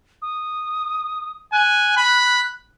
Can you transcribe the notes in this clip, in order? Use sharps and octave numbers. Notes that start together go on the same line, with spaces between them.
D#6
G#5 F#6
B5